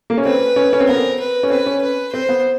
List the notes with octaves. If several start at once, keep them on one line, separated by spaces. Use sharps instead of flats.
A#3
C#4
C4 B4
C#4
C#4
C4
B3 A#4
C4
B4
C#4
C4 B4
C#4
B4
C4 C5
B3